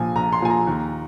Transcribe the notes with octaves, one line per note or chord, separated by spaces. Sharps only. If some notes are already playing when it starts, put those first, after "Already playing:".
Already playing: A#1 A#2 F3 G#5
A#1 A#5
C6
A#2 F3 G#5
A#5
D#2